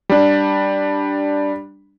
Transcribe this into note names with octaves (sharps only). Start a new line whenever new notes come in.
G3 D4